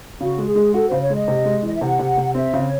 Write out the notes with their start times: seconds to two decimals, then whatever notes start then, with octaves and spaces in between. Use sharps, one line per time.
0.20 C#3 F#4
0.38 G#3
0.47 G#4
0.55 G#3
0.74 F#4 A4
0.88 C#3 C5
1.01 C#5
1.10 G#3 D#5
1.28 C3
1.45 G#3
1.63 E3 D#5
1.74 E5
1.81 C3 F#5
1.99 C3
2.17 C3
2.34 C4 E5
2.53 C#3
2.62 C#5